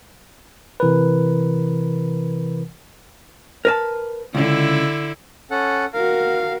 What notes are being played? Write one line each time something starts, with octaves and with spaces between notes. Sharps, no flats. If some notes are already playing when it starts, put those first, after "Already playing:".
C3 E3 A#4 B4
A#4 B4 A5
C#2 D3 E4
C#4 A4 F#5
F#4 A#4 F5